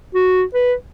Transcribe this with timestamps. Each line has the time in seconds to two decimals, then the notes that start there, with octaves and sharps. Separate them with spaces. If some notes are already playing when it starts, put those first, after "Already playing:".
0.15 F#4
0.54 B4